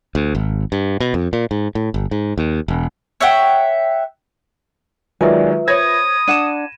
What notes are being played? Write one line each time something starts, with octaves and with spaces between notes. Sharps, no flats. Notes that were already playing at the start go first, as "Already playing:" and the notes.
D2
G#1
G2
B2
F2
A#2
G#2
A2
G1
G#2
D#2
E1
C#5 E5 F#5 G5
D#3 F#3 G#3 F4 B4 D5 E5 G#5
C5 C#5 B5 D#6 G#6 A#6
D4 F#5 D#7 E7